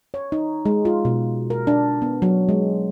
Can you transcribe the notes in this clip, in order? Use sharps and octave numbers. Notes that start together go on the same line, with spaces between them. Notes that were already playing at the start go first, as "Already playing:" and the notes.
C#5
D#4
G#3
F4
B2
A#4
D4
B3
F#3
G#3